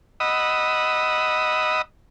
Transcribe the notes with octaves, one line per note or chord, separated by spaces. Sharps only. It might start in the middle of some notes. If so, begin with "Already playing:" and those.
D#5 F#5 B5 D#6 E6